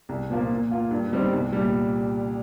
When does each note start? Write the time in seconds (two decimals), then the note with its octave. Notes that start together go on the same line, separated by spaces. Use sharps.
0.09 C2
0.30 A#2 F3 A#3 F4
0.50 A#2
0.71 A#3 F4
0.91 G2
1.12 D#3 G3 C4
1.33 C2
1.53 A#2 G3